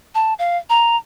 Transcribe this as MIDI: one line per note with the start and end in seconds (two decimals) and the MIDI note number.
0.15 0.34 81
0.39 0.58 77
0.70 0.97 82